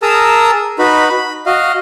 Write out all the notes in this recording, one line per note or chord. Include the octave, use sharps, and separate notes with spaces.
G#4 A#4 A5 A#5 D#6 E6
D#4 F#4 B4 B5
B5
F#4 D#5 F5